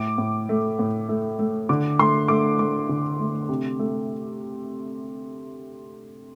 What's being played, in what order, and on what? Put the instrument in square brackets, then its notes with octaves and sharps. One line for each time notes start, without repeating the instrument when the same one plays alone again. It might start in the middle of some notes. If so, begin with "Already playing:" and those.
Already playing: [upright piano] A2 D6
A2
A3
A2
A3
A3
D3 D6
A3 C6
A3 D6
A3 D6
D3
A3
C3
A3